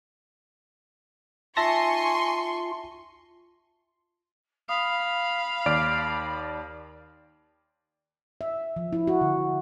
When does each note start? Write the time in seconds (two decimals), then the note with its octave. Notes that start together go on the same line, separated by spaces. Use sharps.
1.57 D#4 F4 E5 G#5 A5 C6 C#6 A#6
4.69 F5 B5 D#6
5.66 D#2 D5 D6 F6 C7 D7
8.41 E5
8.76 F3
8.93 E4
9.07 F#4
9.21 D3